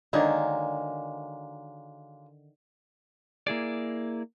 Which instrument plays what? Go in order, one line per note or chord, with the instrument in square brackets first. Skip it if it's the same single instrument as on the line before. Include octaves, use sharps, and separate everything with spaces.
[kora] D3 D#3 [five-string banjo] F#3 G#3 A#3
[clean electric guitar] A#3 E4 G#4 D5